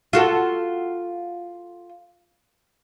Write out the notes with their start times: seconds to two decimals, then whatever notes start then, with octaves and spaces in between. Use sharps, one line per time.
0.13 F4 F#4 A4